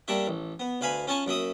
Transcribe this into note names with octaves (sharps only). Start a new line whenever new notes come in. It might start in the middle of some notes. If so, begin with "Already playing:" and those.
G3 A#3 D4 C#5 E5
A1
B3
D2 B4 F5 G#5 B5
C#4 F4 G#5 A5 C#6
F#2 A#3 E5 D#6